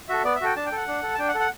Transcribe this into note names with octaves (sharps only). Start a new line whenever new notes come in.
F#4 A4 E5
B3 D5
E5
F#4 A4 G5
D4 A5
G5
A4 F#5
D4
A4
A5
D4 G5
F#5
A4
F#5